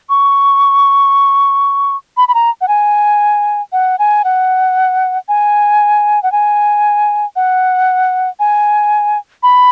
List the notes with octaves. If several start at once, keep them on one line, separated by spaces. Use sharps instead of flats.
C#6
B5
B5
A#5
F#5
G#5
F#5
G#5
F#5
G#5
F#5
G#5
F#5
G#5
B5